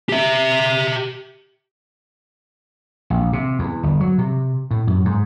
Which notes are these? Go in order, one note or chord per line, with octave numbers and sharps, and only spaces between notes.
G4 E5
A#1
C3
E2
G1
F#3
C3
A2
F#2
G#2